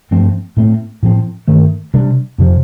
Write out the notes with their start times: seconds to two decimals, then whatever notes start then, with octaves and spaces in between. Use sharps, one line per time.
0.11 G2 F3 A3 C4
0.57 A2 A3 C4
1.03 A2 F3 C4
1.48 G2 D#3 A3
1.94 C3 G3 D4
2.38 F2 C3 F3